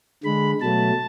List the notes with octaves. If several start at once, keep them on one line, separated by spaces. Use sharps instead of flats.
D3 G#3 B5
B2 F#3 A3 A5